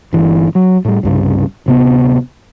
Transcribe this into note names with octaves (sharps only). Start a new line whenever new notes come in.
G1 E3
F#3
A2 G3
C2 G2 C#3
D1 C3 B3